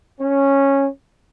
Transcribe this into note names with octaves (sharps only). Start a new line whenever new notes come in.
C#4